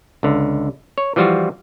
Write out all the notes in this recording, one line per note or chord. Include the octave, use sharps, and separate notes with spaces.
C#2 D3
C#5
E3 F3 G3 F4 F#4